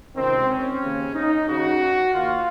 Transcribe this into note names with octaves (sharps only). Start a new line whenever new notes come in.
C#2 C3 D#3 C4
C#4
D#2 C#3
D#4
D#2 C#3 F#4
D#2 D#3 F4